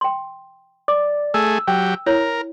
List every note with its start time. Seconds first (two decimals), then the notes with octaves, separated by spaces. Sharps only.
0.01 G5 C6
0.88 D5 D6
1.34 A3 G#4 E6
1.67 F#3 G4 G5
2.06 E4 A#4 C#5